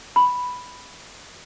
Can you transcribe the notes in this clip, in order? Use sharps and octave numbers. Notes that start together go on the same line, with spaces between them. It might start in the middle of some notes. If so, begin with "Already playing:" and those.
B5